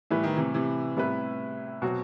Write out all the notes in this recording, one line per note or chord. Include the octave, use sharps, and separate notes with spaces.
A2 E3 G3 B3 E4 B4
D#3
C3 E3
C3 E3
A2 C3 G3 B3 E4 B4
B2 F#3 C4 F#4